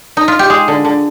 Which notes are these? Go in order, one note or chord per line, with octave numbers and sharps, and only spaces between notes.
D#4
F4
G4
G#3 G#4
D3
D3